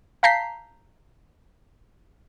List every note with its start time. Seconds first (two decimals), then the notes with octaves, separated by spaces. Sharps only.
0.23 F5 A5 A#5 G6 B6 C7